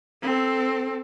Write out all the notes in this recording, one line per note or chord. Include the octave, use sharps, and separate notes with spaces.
C4 A4